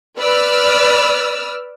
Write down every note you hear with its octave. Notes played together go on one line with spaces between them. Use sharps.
B4 D5 E6 F6